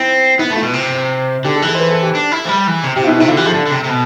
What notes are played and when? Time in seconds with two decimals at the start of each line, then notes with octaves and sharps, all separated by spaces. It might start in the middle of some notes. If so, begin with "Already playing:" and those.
Already playing: C4 E4
0.39 B3 E4
0.50 A3
0.56 F4
0.62 B2
0.73 C3
1.44 D3 G4
1.56 A4
1.62 E3
1.67 A4
1.74 C5
1.80 B4
1.90 A4
2.02 G4
2.15 D4
2.32 E4
2.45 F3
2.49 G3
2.67 E3
2.84 C3
2.96 C3 G4
3.04 F4
3.07 B2 E4
3.19 C3 E4
3.28 D3 F4
3.37 E3 G4
3.45 F3 A4
3.54 D3
3.66 D3
3.72 C3
3.84 C3
3.89 B2